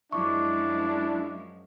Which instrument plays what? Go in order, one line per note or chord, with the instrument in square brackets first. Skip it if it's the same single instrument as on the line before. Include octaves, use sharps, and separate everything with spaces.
[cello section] F#2 F3 G#3 [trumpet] D4 [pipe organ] E4 [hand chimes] C#6 D6